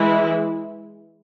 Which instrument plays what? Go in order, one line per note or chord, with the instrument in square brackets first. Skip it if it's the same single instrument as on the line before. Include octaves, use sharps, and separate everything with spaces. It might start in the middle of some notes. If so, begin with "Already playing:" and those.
Already playing: [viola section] E3 G#3 E4